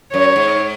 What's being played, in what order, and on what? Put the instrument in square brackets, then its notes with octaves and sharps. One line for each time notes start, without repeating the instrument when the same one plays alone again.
[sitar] F#2 [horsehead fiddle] C#5
[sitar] G#2